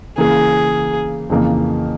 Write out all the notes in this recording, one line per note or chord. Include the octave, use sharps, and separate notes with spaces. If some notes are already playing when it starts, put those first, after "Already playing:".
C#3 E3 A#3 G#4
F2 C#3 E3 A#3